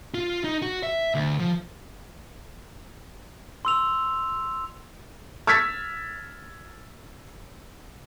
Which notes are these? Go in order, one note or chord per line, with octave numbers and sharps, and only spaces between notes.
F4
D#4
F#4
E5
D2
F3
C6 E6 F7
E6 F6 G#6 A6 B6